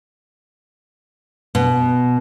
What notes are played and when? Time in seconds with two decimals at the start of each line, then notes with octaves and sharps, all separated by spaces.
1.55 B2